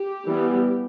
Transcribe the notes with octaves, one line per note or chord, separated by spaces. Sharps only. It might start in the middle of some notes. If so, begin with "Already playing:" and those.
Already playing: G4
E3 G3 B3